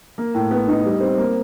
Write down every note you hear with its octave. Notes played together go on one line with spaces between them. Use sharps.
A#3
A2
B3
D#4
G3
C4
A#3